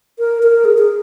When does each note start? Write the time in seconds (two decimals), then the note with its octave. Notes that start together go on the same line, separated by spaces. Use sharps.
0.19 A#4
0.43 A#4
0.65 G#4
0.78 G#4